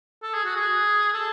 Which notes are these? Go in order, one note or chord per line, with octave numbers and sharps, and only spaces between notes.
A4
G#4
F#4
G#4
A4